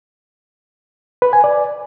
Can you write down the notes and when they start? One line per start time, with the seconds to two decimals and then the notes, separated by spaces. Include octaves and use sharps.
1.22 B4
1.33 G#5
1.44 D5